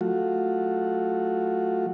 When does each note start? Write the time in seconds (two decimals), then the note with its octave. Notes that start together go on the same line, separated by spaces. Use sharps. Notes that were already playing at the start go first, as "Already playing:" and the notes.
0.01 F#3 A3 F4 F#4